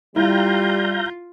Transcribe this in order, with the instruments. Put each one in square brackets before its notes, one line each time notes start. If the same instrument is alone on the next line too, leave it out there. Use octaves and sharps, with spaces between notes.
[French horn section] G3 [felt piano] E4 [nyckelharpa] F4 [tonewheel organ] F5 A#5 G6